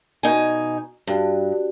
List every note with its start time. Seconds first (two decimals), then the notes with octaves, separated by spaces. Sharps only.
0.23 B2 D#4 G#5
1.07 G2 F#4 G4